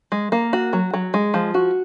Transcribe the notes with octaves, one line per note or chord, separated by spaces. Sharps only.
G#3
A#3
F#4
F#3
F#3
G#3
F3
F#4